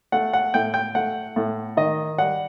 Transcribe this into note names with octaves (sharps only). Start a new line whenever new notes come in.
A3 F#5
F#5
A2 G5
G5
A3 F#5
A2
D#3 D#5
G3 F#5